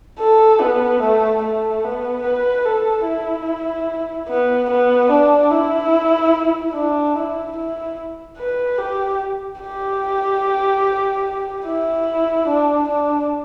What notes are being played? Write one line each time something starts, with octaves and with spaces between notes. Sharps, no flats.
A4
B3
A3
A3
B3
B4
A4
E4
B3
B3
D4
E4
D4
E4
E4
B4
G4
G4
E4
D4
D4